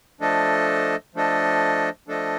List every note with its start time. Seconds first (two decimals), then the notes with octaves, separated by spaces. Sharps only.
0.21 F3 A3 D4 A4 D#5
1.15 F3 A3 D4 A4 D#5
2.08 F3 A3 D4 A4 D#5